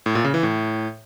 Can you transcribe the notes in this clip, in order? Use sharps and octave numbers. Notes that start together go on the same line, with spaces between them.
A2
A#2
C#3
E3
A2